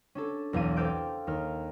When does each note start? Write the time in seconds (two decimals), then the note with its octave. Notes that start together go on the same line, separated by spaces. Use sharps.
0.15 C#4 D4 A4
0.53 B1 E2 F5 D#7
0.76 C4 A4 D5 F5 G6 D7
1.27 D#2 F6